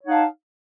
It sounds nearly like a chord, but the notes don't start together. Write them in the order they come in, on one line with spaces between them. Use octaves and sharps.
C#5 D#4 F#5 F5 A5